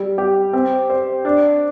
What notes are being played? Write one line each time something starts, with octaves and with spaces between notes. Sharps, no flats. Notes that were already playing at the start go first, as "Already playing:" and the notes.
Already playing: G3
G4
C4
C5
D4